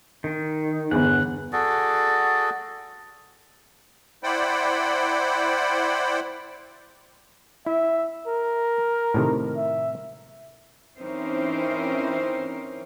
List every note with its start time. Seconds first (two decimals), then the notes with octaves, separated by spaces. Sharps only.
0.24 D#3
0.91 G1 E2 F#5
1.53 F#4 G#4 A4 D5
4.23 E4 C5 D5 F#5 G5 B5
7.66 E4 E5
8.27 A#4
9.14 A2 C3 D#3
9.57 E5
10.98 E3 C4 C#4 D#4 A#4 C5